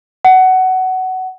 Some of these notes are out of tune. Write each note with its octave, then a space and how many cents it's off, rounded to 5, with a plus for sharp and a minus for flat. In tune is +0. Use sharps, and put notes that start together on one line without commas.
F#5 +15